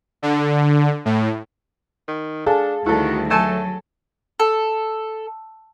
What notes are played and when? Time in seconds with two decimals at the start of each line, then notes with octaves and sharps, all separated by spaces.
0.22 D3
1.05 A2
2.08 D#3
2.46 D4 G#4 A4 F5
2.86 D2 D#3 G3 E4 F#4 A4
3.30 F#3 A3 A4 G#5 A5
4.40 A4